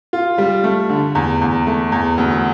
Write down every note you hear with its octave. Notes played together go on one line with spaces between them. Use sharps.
F4
G3
A3
D3
E2
E2
A3
E2
D2